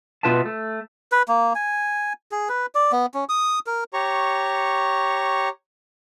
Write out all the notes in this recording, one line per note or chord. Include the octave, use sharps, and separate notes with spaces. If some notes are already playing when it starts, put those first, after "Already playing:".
B2 D#3 F4 B4 E5 A5
A3
B4
A#3
G#5
G#4
B4
D5
B3
C#4
D#6
A#4
G4 C#5 A#5 C#6